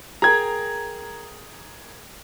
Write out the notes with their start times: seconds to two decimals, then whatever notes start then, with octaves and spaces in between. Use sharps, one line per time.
0.22 G#4 A#4 G5 A#5 G#6